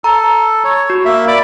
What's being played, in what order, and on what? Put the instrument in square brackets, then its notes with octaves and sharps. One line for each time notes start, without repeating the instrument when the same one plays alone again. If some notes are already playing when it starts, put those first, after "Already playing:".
[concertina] A4 [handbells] A#5
[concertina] C#5
[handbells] F#4
[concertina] A#3 E5
D5 B5 D6